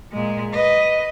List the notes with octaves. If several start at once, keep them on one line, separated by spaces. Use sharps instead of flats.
A#2 G#3
B4 D#5